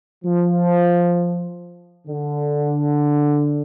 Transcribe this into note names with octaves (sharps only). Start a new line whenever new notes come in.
F3
D3